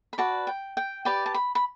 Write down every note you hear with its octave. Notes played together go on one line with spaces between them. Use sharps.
B5
F#4 B4 D5 A5
G5
G5
G4 B4 D5 G5
A5
B5
B5